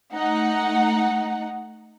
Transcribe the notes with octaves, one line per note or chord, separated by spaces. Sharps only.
A3 D#4 F#5